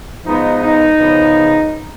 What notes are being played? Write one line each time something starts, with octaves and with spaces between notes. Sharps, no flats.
G#2 F3 G#3 B3 D#4
D#4
C#3 F3 B3